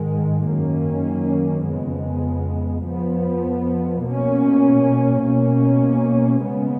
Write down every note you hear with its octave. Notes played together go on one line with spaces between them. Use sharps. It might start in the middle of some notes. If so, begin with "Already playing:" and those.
Already playing: G#2 D#3 G#3
F#2 D#3 A#3 C#4
F2 C#3 G#3 B3
F2 F3 B3
B2 A#3 C#4
B2 A#3 C#4
C#3 G#3 B3